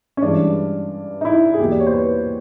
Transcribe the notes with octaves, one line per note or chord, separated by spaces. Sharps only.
C#4
G2 E3 G#3 D4
D#4
E4
G#4
E2 B2 F#3 A#3 G4
D5
C#5
C5
B4